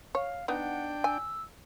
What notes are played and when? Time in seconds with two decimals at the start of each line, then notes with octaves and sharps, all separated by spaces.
0.15 C#5 F5
0.48 B3 D4 D#4 F#5 G5
1.04 G#5 E6